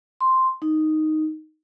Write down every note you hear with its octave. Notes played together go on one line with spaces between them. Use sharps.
C6
D#4